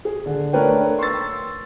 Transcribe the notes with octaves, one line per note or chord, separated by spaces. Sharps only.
G#4
D3
A3 D4 A#4 B4 C#5 G5
C6 C#6 E6 A6